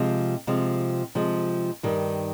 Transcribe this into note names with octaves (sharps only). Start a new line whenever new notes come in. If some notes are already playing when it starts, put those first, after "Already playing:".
Already playing: C3 F3 G#3
C3 F3 G#3
C3 F3 G#3
G2 D#3 G3